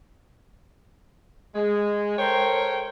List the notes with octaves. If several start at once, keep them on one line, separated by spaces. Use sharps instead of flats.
G#3
A4 A#4 C5 C#5 G5